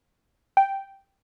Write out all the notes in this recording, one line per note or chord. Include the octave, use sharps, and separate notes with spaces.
G5